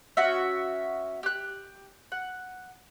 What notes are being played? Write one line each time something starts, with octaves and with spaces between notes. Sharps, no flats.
C#4 F#4 E5
G4 F#6
F#5